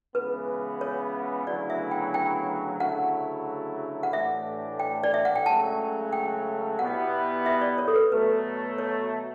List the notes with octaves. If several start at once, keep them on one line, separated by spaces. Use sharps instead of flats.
C#2 C#3 E3 B3 B4
C#5
D2 C#3 F#3 B3 E4 D5
E5
G5
G5
D2 C#3 F#3 A3 E4 F#5
F#5
A2 E3 A3 D4 G4 E5
G5
D5
E5
F#5
G5
C#2 C#3 F#3 A3 A5
G5
B2 G3 B3 E4 F#5
E5
D5
C#5
A4
B4
B2 F#3 A3 B4
C#5